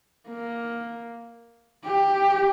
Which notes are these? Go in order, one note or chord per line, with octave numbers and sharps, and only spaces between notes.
A#3
G4